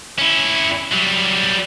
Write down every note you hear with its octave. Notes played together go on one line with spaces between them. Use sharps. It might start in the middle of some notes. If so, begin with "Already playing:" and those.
C#4 E4
F#3 G3